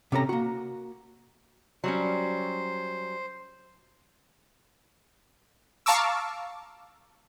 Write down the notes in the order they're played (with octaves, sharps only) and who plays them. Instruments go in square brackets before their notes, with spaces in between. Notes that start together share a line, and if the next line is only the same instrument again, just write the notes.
[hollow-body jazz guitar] C3 C#4 A4 A#5
A#3 F#4
[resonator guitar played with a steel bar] F#3 G3 C#4 [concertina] C5
[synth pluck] F5 A5 A#5 C#6 D6 E6